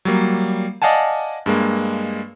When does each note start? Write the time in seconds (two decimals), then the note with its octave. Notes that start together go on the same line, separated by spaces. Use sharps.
0.05 F#3 G3 A#3
0.82 D5 D#5 F5 F#5 G#5 A5
1.46 G2 G#3 A#3